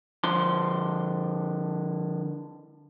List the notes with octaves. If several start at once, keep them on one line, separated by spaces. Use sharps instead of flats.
D3 F3 C6